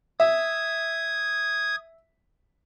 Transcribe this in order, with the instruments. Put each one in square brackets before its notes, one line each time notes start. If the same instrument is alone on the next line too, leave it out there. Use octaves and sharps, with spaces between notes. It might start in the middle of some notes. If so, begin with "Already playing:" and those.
[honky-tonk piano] E5 [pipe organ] D#6 G#6